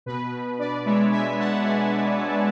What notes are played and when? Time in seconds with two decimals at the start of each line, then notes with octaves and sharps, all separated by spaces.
0.06 B2 B4
0.33 B2
0.58 D4 B4 D5
0.85 G#3 C#5 E5
1.11 B2 E5 G#5
1.39 B2 F#5 A5
1.65 D4 G#5